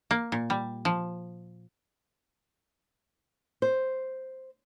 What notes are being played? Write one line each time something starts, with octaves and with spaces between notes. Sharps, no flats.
A#3
A#2
G3
F3
C5